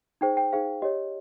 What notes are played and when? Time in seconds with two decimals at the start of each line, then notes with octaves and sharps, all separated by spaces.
0.21 D#4 G#4 C5 G5
0.37 G5
0.53 D#4 G#4 C5 F5
0.82 G4 C#5 D#5